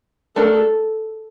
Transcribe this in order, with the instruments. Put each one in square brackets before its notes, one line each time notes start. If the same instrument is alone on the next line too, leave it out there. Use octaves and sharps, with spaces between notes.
[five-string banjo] A3 D4 F#4 A#4 [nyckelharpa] A4